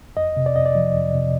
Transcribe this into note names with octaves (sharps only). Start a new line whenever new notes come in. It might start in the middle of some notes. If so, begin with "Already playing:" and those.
F2 D#5
C3
D5
F2 D#5
D5
F3
F2
C3